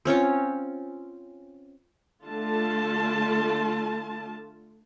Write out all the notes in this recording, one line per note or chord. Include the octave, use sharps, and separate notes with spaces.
C4 C#4 F4 C#5
D3 A3 F4 A5